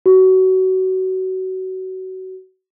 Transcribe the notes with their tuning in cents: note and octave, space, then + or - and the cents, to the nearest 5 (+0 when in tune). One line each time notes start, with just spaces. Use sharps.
F#4 +25